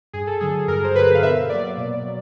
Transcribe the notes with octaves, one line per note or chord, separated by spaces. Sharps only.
G2 G#4
A4
D3 F#3 G#4
G2 A#4
C5
D3 F#3 B4
F5
B2 E5
F#3 A#3 D5
B2
F#3